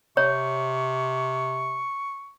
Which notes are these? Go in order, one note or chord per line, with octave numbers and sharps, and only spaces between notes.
C3 C#5 C#6